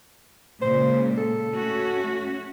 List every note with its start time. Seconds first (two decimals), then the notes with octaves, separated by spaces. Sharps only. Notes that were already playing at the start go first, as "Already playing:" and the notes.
0.62 A#2 C#3 G#3 C5
1.17 A4
1.54 A3 C#4 F#4